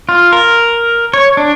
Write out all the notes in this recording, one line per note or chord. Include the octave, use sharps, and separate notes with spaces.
F4
A#4
C#5
D4